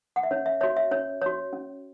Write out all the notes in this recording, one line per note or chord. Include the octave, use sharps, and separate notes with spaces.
F#5
E5
C#4 C#5
E5
F#4 C#5 E5
E5
C#4 C#5
F#4 C#5
C#4